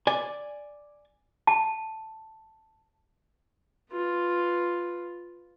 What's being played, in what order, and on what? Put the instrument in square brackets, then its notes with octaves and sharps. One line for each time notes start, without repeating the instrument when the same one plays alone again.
[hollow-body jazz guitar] D5 G#5
[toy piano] A5
[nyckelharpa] F4 B4